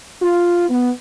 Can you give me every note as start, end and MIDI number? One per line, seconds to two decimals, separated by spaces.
0.22 0.68 65
0.69 0.89 59